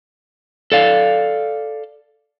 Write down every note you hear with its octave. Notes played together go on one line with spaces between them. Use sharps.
A4 D5 F5